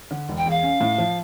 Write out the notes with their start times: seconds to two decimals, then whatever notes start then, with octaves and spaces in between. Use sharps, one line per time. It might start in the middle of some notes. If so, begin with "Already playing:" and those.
0.11 D3
0.29 E1
0.37 G5
0.46 E2 F5
0.63 C#4
0.80 A2
0.98 F3